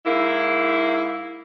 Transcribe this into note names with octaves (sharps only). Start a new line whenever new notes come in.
G#2 A#3 E4